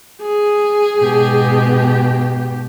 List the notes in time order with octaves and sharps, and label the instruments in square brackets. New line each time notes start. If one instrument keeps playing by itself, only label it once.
[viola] G#4
[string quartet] G#2 B2 G4